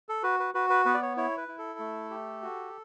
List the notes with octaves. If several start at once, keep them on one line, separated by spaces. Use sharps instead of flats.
A4
F#4 B4
B4
F#4 B4
B4
B3 B4
D5
C#5
E4 C#5
B4
E4
A4
A3
G4
F#4